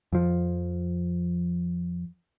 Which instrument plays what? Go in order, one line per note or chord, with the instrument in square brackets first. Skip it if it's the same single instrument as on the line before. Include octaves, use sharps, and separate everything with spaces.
[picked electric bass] F2 F3